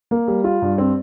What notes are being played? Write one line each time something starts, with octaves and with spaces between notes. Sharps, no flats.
A#3
G3
F4
G2
C4